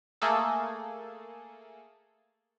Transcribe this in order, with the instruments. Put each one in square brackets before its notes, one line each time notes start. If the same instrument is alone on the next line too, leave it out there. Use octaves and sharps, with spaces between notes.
[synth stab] A3 A#3 G#4 A4